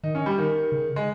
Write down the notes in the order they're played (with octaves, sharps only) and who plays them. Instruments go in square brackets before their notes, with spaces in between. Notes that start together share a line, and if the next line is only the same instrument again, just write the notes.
[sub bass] D#3 [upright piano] D#4
[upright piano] C#4
G3
D#3
[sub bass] C#3
[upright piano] G#3